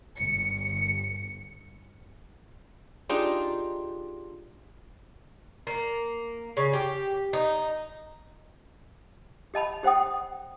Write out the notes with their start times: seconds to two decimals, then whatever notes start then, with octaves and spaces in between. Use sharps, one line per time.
0.17 G1 C#7
3.09 D4 D#4 F4 G4 G#4
5.67 A#3
6.57 C#3
6.73 G4
7.33 D#4
9.54 G4 D#5 A5 B5
9.83 G4 C5 F#5 G5 D#6